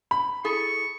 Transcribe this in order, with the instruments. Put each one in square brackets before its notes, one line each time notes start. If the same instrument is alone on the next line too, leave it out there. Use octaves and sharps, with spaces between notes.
[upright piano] B5
[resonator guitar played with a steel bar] E4 G#4 A4 [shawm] C#6